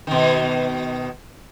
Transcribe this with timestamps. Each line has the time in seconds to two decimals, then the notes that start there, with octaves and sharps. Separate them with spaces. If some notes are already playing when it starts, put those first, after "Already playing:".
0.07 B2 D#3